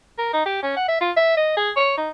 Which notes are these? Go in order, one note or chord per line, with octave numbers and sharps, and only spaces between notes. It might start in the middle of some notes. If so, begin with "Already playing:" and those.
A#4
D#4
G4
C#4
F#5
E5
F4
E5
D#5
G#4
C#5
D#4